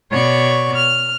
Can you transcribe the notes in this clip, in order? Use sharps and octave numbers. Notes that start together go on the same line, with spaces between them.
B2 C#5 D5 C#6
F6